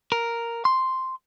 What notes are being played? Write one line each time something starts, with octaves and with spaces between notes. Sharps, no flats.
A#4
C6